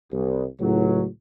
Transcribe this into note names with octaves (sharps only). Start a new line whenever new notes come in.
C2
C#2 A2 F#3